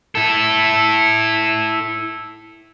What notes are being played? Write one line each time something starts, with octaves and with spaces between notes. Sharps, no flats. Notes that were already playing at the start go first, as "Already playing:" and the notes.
E4 A4